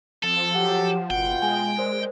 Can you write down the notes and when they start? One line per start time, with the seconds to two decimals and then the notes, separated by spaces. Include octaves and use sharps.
0.23 F3 C4 A4
0.55 F#3 G4 F#5
1.10 F#1 B2 F4 F#5 G5 C#7
1.42 G#3 G#5
1.78 A#4 C5 D5